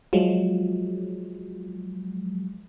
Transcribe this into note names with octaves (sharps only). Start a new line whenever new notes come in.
F3 F#3 G#3